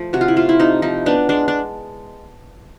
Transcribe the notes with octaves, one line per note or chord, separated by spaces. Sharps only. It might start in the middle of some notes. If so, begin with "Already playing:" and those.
Already playing: F3 A3
C3 F#4
F4
E4
A3 F4
E4
C3 D#4
F3 D#4
B3 D4
G#3 D4
D4